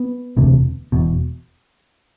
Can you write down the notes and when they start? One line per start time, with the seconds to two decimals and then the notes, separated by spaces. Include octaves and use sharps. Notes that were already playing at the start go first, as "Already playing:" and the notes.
Already playing: B3
0.37 E1 D2 C3
0.92 E1 E2 B2